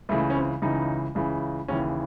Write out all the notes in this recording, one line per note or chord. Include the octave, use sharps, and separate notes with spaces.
C#2 C#3 E3 A3
C#4
C4
C#2 C#3 E3 D#4
C#2 C#3 E3
D#2 C#3 E3 C#4